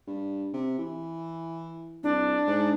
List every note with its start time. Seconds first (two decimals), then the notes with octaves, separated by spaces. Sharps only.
0.07 G2
0.53 C3
0.78 E3
2.03 C2 D4
2.47 G#2